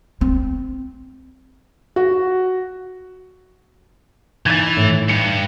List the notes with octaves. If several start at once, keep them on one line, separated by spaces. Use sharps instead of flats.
C4
F#4
E3 G#6 A6
A2
G2 C#7